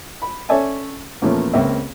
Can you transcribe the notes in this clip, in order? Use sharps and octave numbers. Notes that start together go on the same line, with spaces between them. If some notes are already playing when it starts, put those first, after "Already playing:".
B5
C#4 A4 D5 E5 G#5 A5
E2 A#2 F3 A3 A#3 C#4
C#2 A#3 C4 E5